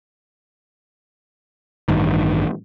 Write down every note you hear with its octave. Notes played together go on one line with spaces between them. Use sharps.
A1 G2 D#3